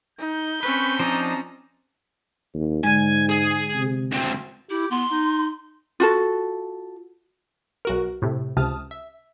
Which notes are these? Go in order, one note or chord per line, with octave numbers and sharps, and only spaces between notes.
D#4 G6
C4 C#4 B4 B5 C#6
F3 D4 D#4 A5 A#5
D#2
G#2 D3 G#3 G#5
G#4
C3
D2 C4
E4 G4
B3 C6
D#4
F4 F#4 A4
B1 F#4 A#4
A2 C3
C#2 C3 A5 D#6 F6
E5